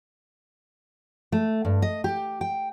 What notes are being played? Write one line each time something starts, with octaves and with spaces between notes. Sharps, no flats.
A3
G2
D#5
G4
G5